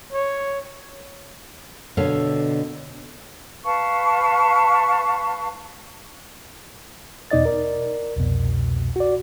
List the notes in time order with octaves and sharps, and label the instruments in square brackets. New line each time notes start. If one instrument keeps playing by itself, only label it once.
[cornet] C#5
[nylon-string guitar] B2 D3 A4 C#5 F5
[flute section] B4 F5 A5 C#6
[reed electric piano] E2 B2 D#4 D5 D#5 A6
A#4 D5
C2 F2 B2
F#4 D5